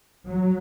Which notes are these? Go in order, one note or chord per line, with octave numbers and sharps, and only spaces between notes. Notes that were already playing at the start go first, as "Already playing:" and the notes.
F#3